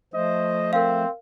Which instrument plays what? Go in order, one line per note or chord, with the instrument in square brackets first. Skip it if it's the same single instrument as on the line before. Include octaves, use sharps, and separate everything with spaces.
[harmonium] F3 A3 C5 [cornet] D#5
[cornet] C4 [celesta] A#4 F5